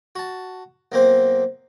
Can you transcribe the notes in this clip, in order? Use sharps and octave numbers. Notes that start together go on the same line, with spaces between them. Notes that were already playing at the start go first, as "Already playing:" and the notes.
F#4 A5
B1 A#3 C4 C5